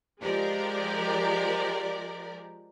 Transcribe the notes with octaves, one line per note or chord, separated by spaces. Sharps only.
F3 G#3 G4 A#4 D5